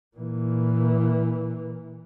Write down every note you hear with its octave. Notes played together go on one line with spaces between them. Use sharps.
A#2 E3